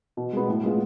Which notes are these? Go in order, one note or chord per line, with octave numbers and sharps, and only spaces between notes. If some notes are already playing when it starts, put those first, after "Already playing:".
B2
G#3 B3
A2
G#3 B3 F4